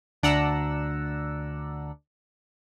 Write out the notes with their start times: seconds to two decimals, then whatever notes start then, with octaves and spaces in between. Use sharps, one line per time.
0.23 D2 D4 D5 F#5 A#5 E6